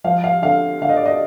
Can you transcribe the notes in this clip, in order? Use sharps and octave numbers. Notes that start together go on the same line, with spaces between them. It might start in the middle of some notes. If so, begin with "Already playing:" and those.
F3 F5
F5
D3 F5
D3 F5
D#5
D5
D#5